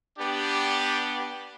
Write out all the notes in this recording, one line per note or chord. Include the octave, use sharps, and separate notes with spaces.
B3 D4 G4